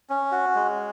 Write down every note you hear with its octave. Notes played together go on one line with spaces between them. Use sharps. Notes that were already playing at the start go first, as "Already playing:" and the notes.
C#4
F#4
G#3